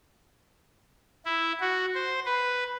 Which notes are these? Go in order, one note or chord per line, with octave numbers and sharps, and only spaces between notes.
E4
F#4
C5
B4